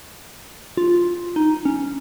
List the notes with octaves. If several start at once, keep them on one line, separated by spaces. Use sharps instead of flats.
F4
D#4
C#4